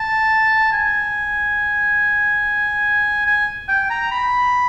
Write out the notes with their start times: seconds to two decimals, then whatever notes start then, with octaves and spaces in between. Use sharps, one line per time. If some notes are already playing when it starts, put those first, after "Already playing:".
Already playing: A5
0.72 G#5
3.26 G#5
3.68 G5
3.90 A#5
4.11 B5